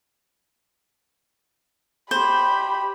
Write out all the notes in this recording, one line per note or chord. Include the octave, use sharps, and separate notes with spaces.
G4 C5 B5